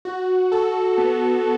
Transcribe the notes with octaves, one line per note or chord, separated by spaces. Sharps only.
F#4
A4
B3